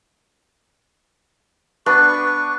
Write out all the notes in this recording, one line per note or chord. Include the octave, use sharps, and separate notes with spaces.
B3 D4 B4 C#6